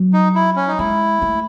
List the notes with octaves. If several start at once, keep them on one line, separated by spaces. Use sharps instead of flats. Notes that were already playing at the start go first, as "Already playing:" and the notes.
Already playing: F#3
D#4
E4
C#4
D#4
G#3 E4
A3